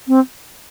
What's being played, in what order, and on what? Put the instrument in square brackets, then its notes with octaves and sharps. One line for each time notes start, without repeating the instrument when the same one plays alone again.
[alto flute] C4